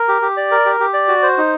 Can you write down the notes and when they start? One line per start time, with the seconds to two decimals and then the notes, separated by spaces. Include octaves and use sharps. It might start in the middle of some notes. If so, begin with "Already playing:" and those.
Already playing: A#4
0.08 G4
0.22 G4
0.37 D5
0.51 A#4
0.66 G4
0.80 G4
0.94 D5
1.08 F#4
1.22 C5
1.38 D#4